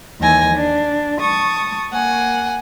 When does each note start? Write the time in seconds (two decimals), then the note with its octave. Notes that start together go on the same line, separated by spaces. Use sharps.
0.21 D#2 E3 G#5 A#6
0.53 D4
1.19 A5 C#6 D#6
1.90 A#3 F#5 G#5